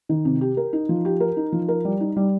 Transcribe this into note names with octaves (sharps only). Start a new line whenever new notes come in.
D#3
C3
G4
A#4
D#4
F3
G4
A#4
D#4
F3
A#4
G3
D#4
G3